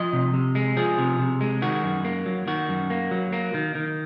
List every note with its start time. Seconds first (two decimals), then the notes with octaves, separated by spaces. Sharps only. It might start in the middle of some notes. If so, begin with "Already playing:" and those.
Already playing: F3 D#5
0.13 C3
0.33 C3
0.55 G#3
0.77 F3 G#4
0.98 C3
1.19 C3
1.41 G#3
1.62 D#3 F#4
1.84 F#2
2.05 A#3
2.26 F#3
2.47 D#3 F#4
2.69 F#2
2.90 A#3
3.11 F#3
3.33 A#3
3.54 D#3
3.75 D#3